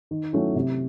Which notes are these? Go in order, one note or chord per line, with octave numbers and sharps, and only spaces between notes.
D#3
F#3 A3 C#4 E4
C3